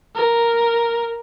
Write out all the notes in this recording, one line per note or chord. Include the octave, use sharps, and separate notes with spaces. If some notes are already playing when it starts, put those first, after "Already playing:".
A#4